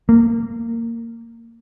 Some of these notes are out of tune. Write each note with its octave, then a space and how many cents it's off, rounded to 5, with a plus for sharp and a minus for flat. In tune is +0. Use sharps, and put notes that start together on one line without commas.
A#3 -15